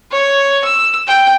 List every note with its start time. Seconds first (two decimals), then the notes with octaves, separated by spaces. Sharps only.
0.11 C#5
0.65 E6
1.07 G5